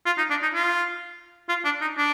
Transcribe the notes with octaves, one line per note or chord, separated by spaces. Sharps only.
F4
D#4
D4
D#4
F4
F4
D4
D#4
D4